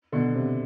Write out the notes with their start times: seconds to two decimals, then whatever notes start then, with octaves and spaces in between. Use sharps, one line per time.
0.12 B2 D3
0.34 C3